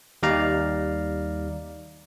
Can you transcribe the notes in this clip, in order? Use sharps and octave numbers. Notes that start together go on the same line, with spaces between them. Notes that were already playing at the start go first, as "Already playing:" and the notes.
D#2 G3 D#4 D5 F5 A#5